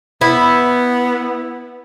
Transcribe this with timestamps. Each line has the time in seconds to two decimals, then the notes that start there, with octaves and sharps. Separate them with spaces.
0.21 B3 E4